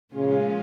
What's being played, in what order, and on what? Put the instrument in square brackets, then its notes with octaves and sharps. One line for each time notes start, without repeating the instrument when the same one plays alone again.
[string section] A#2 F3 G#3 C#4 F4 [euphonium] C#3